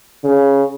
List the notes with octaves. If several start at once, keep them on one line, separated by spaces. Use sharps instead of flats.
C#3